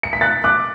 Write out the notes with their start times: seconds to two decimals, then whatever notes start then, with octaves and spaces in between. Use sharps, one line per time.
0.03 C#7
0.13 B6
0.21 F#6 A6
0.44 D6 F#6